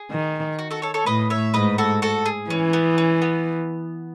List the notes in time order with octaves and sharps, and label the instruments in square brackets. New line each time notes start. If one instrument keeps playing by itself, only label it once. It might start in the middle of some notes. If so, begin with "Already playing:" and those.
Already playing: [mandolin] G#4
[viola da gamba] D#3
[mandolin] F#4
F#4 A4
A4 C#5
A4 C#5
[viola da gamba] A2 [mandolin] B4 D#5
[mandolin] C#5 E5
[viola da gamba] G#2 [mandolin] B4 D#5
[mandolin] F#4 A4
F#4 A4
G#4
[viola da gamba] E3 [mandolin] C#4
[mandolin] B3
C#4
B3